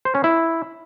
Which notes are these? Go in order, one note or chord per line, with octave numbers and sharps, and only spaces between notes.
C5
C#4
E4